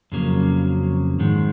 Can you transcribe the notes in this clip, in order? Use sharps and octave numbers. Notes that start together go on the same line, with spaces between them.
F2 C#3 F#3 A#3
G#2 D#3 G#3